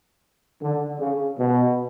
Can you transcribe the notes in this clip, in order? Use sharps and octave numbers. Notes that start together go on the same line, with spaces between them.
D3
C#3
B2